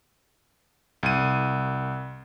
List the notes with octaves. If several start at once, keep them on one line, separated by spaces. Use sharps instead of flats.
C2 D#7